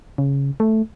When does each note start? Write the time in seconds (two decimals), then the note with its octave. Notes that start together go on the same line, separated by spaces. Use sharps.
0.18 C#3
0.60 A3